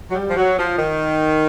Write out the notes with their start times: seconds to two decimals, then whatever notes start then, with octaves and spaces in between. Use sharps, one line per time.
0.10 F#3
0.15 G3
0.28 F3
0.36 F#3
0.58 F3
0.78 D#3